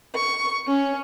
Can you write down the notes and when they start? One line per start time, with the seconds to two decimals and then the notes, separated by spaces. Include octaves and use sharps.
0.16 C#6
0.68 C#4